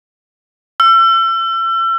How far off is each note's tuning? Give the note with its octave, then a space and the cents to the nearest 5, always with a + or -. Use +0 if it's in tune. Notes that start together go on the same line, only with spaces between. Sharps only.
E6 +35